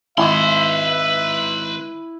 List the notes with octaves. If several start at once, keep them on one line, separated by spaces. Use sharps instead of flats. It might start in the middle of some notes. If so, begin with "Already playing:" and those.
G#1 E4 B4 E5 C6